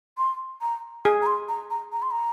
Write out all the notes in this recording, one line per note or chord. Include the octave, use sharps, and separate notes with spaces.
C6
A#5
G#4 G#5
A#5
C6
A#5
A#5
A#5
C6
A#5